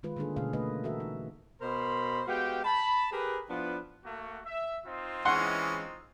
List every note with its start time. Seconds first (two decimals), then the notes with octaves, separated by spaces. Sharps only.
0.03 D#3 G#3 F4 B4
0.16 D3 G3 A#3 D4 G#4 A4
0.36 B2 D3 A3 C#4 G#4 F5
0.53 A3 A#3 B4 D#5
0.84 E3 F#4 A4 A#4 E5
1.00 D#4
1.61 B2 A#4 C5 B5 C6
2.27 G#3 B3 F#4 G4 F5 G5
2.65 A5 B5
3.12 G4 G#4 A#4 B4
3.50 F3 B3 D4 E4 F4 B4
4.05 A3 A#3 F#4
4.45 E5
4.85 C4 D#4 F4
5.25 E3 G#3 C#4 F#5 C6